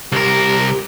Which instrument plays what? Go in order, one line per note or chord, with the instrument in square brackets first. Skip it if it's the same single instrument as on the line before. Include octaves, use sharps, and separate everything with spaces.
[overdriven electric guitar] C2 A#4 [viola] G4